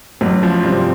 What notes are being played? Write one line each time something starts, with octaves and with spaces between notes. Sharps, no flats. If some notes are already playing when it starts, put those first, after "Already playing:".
A1 F#2 F#3
F3
G2 C3 C4